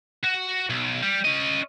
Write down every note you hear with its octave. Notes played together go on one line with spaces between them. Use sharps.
F#4
B1
G3
C#4 D#5